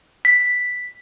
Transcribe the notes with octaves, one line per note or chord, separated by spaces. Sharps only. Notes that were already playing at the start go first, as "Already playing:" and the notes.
B6